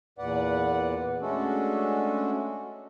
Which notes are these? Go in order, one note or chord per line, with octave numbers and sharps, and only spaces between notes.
E2 A#2 B4 D5 F#5
G#3 A3 C#4 D4 F#4 A4